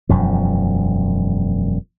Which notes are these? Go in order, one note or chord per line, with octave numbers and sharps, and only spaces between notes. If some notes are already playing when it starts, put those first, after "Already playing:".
E1 F#2 F3